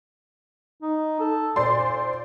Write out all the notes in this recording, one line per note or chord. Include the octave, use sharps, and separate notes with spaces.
D#4
A4
A#2 C5 D5 C6